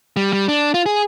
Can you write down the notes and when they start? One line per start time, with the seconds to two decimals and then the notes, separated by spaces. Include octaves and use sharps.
0.16 G3
0.33 G3
0.48 D4
0.74 F4
0.86 G#4